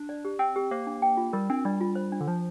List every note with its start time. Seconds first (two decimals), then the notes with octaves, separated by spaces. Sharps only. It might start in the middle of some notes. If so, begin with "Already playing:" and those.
Already playing: D4
0.09 D5
0.25 G4
0.39 C4 G5
0.56 G4
0.71 A#3 C5
0.87 D4
1.02 G5
1.17 F4
1.33 G3 A#4
1.50 C4 D4
1.65 G3 D4
1.81 F4
1.95 C5
2.12 D4
2.21 D3
2.28 F3 D4